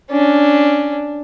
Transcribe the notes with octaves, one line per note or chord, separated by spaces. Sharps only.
C#4 D4